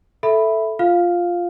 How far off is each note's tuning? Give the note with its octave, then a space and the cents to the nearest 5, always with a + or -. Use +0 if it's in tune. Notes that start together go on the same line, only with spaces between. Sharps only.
A4 +0 E5 +0 B5 +0
F4 +0 F5 +0